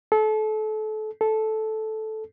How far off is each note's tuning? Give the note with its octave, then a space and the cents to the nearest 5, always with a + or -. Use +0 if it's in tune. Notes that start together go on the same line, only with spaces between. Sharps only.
A4 -30
A4 -10